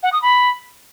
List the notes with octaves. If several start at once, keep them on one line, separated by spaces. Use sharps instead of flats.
F#5
D#6
B5